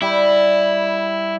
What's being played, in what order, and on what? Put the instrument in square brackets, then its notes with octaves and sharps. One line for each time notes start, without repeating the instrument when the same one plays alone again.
[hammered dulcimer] G3 [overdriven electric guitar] E4